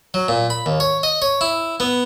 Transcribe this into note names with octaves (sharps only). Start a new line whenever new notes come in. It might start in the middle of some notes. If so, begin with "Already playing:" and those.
F#3
A#2
B5
D#2
C#5
D#5
C#5
E4
B3